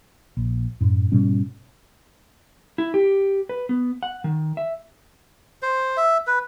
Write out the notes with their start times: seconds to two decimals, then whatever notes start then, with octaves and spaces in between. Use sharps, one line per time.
0.37 A#1
0.81 F#2 A2
1.12 G#2 B2 G3 C#4
2.78 E4
2.94 G4
3.49 B4
3.69 B3
4.03 F#5
4.24 D#3
4.57 E5
5.62 C5
5.97 E5
6.27 B4